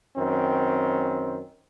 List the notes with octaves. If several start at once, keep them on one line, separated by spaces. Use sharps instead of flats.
F#2 D#3 C4